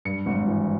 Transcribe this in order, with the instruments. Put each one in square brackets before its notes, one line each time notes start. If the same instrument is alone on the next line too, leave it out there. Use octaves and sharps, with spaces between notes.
[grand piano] G2 C#7
G#1
E3